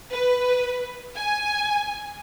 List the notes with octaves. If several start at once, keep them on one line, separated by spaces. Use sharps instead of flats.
B4
G#5